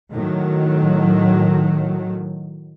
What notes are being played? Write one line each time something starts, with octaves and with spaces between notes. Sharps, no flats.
A2 D#3 F#3